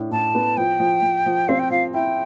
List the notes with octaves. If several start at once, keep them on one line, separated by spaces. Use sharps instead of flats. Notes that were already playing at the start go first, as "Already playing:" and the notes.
Already playing: A2 D4
A2 A5
B3
F3 G5
F3
F3
F3
C4 F5
G5
F3 F5
E4 G5